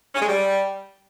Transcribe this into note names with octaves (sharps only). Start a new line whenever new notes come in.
C#4
G#3
G3